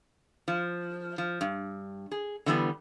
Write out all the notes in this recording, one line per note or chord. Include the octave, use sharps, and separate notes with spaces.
F3
F3
G2
G#4
D3 E3 G3 A#3 B3